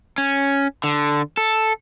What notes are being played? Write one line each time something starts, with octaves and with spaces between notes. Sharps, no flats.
C#4
D3
A4